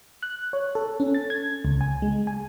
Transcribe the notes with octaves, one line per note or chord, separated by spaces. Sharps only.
F#6
C#5
A4
C#4
A6
G#6
C#2
G#5
G#3
G#5